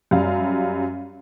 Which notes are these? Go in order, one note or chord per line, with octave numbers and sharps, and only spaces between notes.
F#2 G3 F5